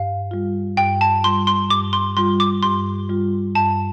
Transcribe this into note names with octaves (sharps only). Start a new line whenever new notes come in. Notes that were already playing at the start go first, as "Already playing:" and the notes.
Already playing: G2 F5
G3 F4
G2 G5
A5
G3 F4 C6
C6
G2 D6
C6
G3 F4 C6
D6
G2 C6
G3 F4
G2 A5